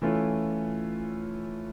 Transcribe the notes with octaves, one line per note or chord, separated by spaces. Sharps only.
E3 A3 C#4 F4